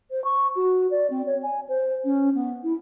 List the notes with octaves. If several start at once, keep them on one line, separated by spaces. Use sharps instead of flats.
C5
C#6
F#4
D5
C4
C#5
G#5
C5
C#4
B3
E4